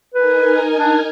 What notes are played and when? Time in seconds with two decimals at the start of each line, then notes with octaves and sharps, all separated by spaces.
0.14 D#4 A#4 B4 G#5
0.78 D4